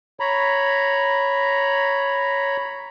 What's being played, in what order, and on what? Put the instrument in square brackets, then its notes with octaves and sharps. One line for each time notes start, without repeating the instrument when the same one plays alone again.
[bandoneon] C#5 A#5 B5